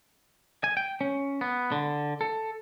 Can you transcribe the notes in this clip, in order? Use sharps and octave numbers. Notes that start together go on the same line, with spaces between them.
G#5
G5
C#4
B3
D3
A4